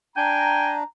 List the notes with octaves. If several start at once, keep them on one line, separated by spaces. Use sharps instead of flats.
D4 G5 G#5 A#5